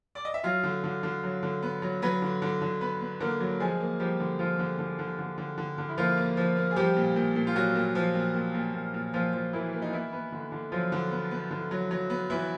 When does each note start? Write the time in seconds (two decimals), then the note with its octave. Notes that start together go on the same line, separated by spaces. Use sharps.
0.15 D5
0.25 D#5
0.34 E5
0.44 F#3 F4 F5
0.63 D3
0.84 D3
1.03 D3
1.23 F#3
1.43 D3
1.62 B3
1.82 F#3
2.02 F#3 B3 B4
2.22 D3
2.42 D3
2.61 D3
2.81 B3 B4
3.01 B3
3.20 D3 A#3 A#4
3.40 F#3
3.60 F3 G#3 G#4
3.80 A#3
4.00 F3 G3 G4
4.20 D3
4.39 F3 F4
4.59 D3
4.79 D3
4.99 D3
5.18 D3
5.38 D3
5.58 D3
5.78 D3
5.89 E4
5.97 F3 A#3 F4
6.17 A#3
6.37 F3
6.57 A#3
6.71 G#4
6.76 F3 G3 G4
6.97 A#2
7.16 A#2
7.36 A#2
7.47 F4
7.55 A#2 F#3 F#4
7.75 A#2
7.95 F3
8.14 A#2
8.34 A#2
8.55 A#2
8.74 A#2
8.94 A#2
9.14 A#2 F3 F4
9.34 F3
9.53 E3 A#3 E4
9.73 A#3
9.82 D#4
9.93 E3 B3 E4
10.13 B3
10.32 D3
10.52 D3
10.72 F3 F#3 F4
10.92 D3
11.11 B3
11.31 B3
11.51 D3
11.71 F#3
11.91 F#3
12.10 B3
12.30 E3 B3 E4